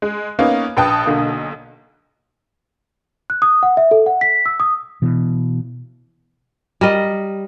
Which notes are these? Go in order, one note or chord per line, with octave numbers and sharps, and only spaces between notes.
G#3
A#3 B3 C#4 D#4
A#1 B4 G5 A5 D#6
B1 D3 A#3
F#6
D#6
F#5
E5
A4
F#5
B6
E6
D#6
B2 E3
G3 A#4 D#5